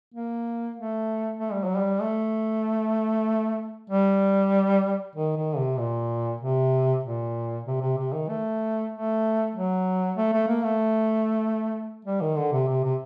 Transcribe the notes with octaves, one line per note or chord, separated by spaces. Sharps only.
A#3
A3
A3
G3
F#3
G3
A3
G3
D#3
D#3
C3
A#2
C3
A#2
C3
C3
C3
D#3
A3
A3
F#3
A3
A3
A#3
A3
G3
D#3
D3
C3
C3
C3